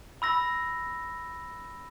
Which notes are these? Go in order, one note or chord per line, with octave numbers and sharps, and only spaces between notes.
B5 E6 A#6